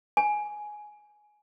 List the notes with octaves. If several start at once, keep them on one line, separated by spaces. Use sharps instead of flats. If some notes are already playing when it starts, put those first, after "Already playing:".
G#5